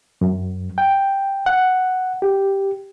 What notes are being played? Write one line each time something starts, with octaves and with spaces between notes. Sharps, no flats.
F#2
G5
F#5
G4